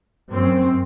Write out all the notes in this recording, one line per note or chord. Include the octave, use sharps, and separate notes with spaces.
F#2 C4